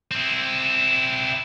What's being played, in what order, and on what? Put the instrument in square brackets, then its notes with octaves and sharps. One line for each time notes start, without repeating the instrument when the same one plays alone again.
[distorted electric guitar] C4 E4